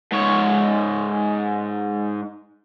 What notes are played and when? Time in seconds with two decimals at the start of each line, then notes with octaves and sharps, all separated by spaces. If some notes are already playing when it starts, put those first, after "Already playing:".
0.12 G#2 C#5